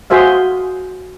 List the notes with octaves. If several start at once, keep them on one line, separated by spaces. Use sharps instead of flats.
F#4 G#4 C5 E5 F5